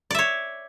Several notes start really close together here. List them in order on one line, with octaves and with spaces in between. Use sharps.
D5 E5 C#5